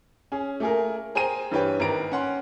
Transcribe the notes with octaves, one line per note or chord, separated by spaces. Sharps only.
C#4 G#4
A3 A#3 G#4 A#4
G#4 C5 G5 A#5 D#7
G2 E3 G4 B4 C#5 G5
G#1 A#4 B4 A#5 D7
C#4 F#5 C6